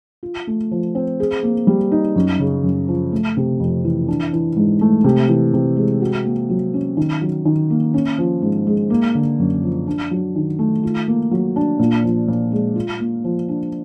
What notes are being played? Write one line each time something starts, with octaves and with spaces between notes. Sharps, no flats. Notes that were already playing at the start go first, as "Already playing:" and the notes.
F4
A3
F3
C4
G#4
A#3
G3
D#4
F#2
C#3
F#2
F3
A3
C3
F2
E3
D4
E3
G#2
A3
C3
E3
C3
G#3
F#4
A#3
F#3
C#4
D#3
F#3
D#3
A#3
C#4
F3
G#2
G#3
A#3
D3
F#2
F3
D4
F#3
D#3
A3
F4
A#3
F#3
D4
A#2
F3
A#2
G#3
F4
A#3
F3
D4